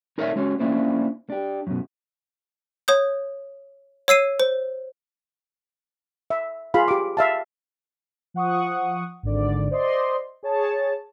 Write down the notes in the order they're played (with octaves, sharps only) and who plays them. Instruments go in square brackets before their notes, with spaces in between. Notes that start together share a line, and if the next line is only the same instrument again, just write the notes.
[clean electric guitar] D#4 A#4 C#5 D5 E5
G#3 C#4 F#4 C#5
A#3 C#4 D4 E4 F4 C5
D4 G4
F#2 B2
[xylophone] C#5 D#6 G6
C#5 E6 C7 D#7
C5
[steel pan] E5
F4 G#4 F5 B5
G4 D6
E5 F5 A5
[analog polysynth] F3 F#5 C#6 D#6
G#1 D3 D5
C5 D5 D#5 C6
G#4 C#5 A5